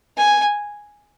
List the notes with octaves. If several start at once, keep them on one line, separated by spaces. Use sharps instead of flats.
G#5